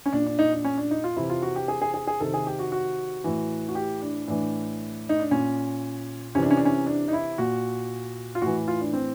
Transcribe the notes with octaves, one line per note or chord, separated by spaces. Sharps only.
C#4
A#2 D4
D4
D#4
D4
C#4
D4
D#4
F4
C3 E3 E4
F4
F#4
G4
G#4
G#4
G#4
G#4
C3 D#3 A4
G#4
G4
F#4
F#4
A2 E3
F#4
G4
D4
A2 E3 D4
D#4
D4
A#2 C#4
C3 E3 C#4
D4
C#4
D4
C#4
D4
D#4
E4
A#2 F#4
F4
A2 E3 F#4
F4
D4
C4